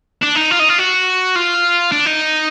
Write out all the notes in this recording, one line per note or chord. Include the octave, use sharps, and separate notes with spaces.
D4
D#4
F4
D#4
F4
F#4
F4
D4
D#4